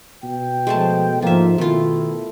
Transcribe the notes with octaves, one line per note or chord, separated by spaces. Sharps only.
B2 G5
F3 G#3 A3 A5
G#2 F3 A#3 F4 E5
B2 D#3 A3 E4 F4